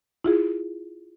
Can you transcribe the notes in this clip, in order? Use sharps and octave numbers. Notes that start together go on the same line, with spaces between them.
E4 F4 G#4